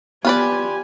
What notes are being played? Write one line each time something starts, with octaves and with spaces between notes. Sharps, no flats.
B3 F4 G4 B4 D5 G#5